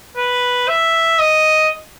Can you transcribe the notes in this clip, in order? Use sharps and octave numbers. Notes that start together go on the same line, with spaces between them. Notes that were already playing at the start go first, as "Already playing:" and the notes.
B4
E5
D#5